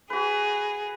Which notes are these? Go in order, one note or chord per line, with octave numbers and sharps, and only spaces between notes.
F#4 G#4 B4